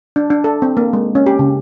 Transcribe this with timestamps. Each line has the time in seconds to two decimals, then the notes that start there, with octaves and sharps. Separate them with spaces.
0.16 D4
0.30 D4
0.44 A4
0.62 C4
0.77 A#3
0.93 G#3
1.15 C#4
1.26 G4
1.39 C#3